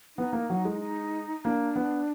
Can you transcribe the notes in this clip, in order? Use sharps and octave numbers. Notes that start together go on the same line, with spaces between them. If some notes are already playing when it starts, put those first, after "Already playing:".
B3 D#4
A#3
F#3
G#3
D#4
A#3 D4
B3